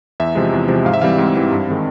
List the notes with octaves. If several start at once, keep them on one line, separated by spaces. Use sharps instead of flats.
E2 E5
C3 F3 G#3
E2
C3 F3 G#3
G#2 F5
E5
E3 G3 C4 F5
G#2
E3 G3 C4
G2
D#3 G#3 C4